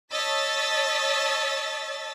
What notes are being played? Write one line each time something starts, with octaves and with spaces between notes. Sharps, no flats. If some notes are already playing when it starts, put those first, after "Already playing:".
C#5 D#5 A5 E6 A6 B6